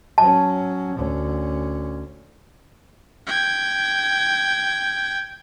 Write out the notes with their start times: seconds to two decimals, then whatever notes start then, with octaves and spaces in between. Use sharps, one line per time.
0.18 F#3 C#4 A5
0.96 D2 C#4
3.27 G5 G#6